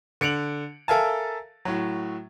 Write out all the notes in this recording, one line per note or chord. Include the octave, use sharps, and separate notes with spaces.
D3 C#7 D7 F7 F#7
A4 A#4 E5 F5 G#5 A5
A2 F#3